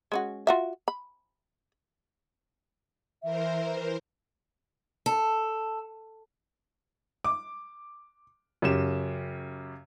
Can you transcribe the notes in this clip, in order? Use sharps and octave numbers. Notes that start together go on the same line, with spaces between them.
G#3 C#4 F#4
F4 F#4 E5
B5
E3 A#4 C5 E5
A4
D6
F#2 C#3 G4 E7